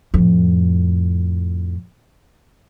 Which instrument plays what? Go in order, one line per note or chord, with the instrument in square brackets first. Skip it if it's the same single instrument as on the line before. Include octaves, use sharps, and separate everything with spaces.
[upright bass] F2 A2